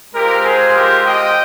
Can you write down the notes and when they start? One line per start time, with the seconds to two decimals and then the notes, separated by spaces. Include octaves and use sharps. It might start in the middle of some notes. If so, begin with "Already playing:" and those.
0.14 G#3 C4 F4 G4 A#4
0.45 G#4 C5
0.76 G4 A#4
1.05 D#5 G5